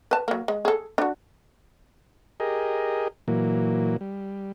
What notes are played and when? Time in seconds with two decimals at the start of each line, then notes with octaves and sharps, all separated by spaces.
0.11 B4 A5
0.28 F#3 A#3
0.48 G#3
0.65 G#4 A4
0.98 D4 F#4
2.40 G4 G#4 A#4 D#5
3.28 A#2 E3 F#3 A#3
4.01 G3